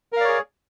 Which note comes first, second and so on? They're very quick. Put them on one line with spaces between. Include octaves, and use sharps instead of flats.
A#4 F5 D5 C#5 G#4